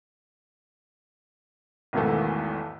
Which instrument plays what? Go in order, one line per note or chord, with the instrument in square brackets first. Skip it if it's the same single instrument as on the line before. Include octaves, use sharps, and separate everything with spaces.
[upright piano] B1 E2 G#2 D#3 E3 A3